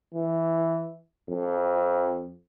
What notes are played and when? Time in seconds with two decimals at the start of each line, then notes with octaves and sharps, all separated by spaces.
0.14 E3
1.30 F2